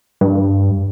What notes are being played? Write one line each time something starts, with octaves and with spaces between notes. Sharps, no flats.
G2